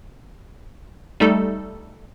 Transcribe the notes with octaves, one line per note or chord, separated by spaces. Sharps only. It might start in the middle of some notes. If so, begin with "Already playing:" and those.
G3 A3 D#4 A4